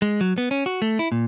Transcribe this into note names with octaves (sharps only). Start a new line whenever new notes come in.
G#3
F#3
B3
C#4
F#4
A3
E4
A#2